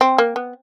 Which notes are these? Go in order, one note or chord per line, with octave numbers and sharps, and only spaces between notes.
C4
A#3
B3